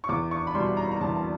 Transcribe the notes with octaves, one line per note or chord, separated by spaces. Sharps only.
C#6
E2 D6
C#6
B5
B2 G3 C6
A#5
B5
A#5
E2 A5
A5